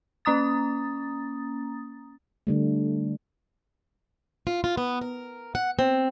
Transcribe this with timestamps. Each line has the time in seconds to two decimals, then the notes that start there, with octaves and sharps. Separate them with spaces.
0.25 A#3 C#4 A#5 D#6 A6
2.47 D3 G3 A3
4.47 F4
4.64 F4
4.77 B3
5.01 A#4
5.55 F#5
5.79 C4